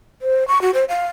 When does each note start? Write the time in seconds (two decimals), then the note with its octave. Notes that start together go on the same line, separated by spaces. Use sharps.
0.21 C5
0.47 C#6
0.61 F#4
0.74 C5
0.89 F5